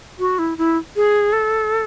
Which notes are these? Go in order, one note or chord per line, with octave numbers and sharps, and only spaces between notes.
F#4
E4
E4
G#4
A4